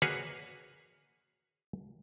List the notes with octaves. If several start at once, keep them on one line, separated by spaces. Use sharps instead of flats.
A#3 F#4 G#4 B4 C#5